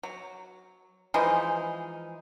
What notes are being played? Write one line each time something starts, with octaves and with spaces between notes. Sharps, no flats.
F#3
E3 F3 G#3 D#4